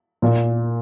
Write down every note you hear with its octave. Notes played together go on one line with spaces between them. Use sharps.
A#2